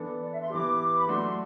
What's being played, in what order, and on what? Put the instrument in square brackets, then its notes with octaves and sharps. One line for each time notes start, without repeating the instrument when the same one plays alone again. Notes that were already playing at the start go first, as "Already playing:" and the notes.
Already playing: [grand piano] E3 B3 D4 A4
[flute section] D5
E5
C6
[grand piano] E3 B3 E4 G4 [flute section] D6
[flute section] B5
[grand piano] F#3 A3 D4 F#4 [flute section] C6